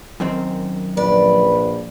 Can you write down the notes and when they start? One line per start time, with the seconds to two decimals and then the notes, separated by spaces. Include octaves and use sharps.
0.20 F#2 D#3 C4
0.97 A#1 B4 D5